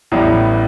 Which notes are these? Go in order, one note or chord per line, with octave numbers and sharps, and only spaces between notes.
A1 A2 E3 G3 B3